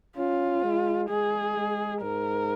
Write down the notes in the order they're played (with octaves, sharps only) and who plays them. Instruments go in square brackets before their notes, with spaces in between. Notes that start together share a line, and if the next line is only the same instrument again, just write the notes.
[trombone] C#4 [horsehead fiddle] F4
[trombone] G#3
[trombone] G#3 [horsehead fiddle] G#4
[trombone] G#3
[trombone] G#2 [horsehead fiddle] A#4